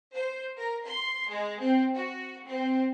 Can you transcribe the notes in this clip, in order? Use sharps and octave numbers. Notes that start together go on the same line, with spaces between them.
C5
A#4
C6
G#3
C4
F#4
C4